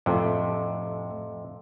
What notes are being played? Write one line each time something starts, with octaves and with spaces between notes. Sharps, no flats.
F2 A2 C3 F3 A3